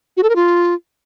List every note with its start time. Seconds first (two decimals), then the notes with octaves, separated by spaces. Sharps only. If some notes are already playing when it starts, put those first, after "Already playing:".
0.17 F#4
0.23 A4
0.29 A#4
0.36 F4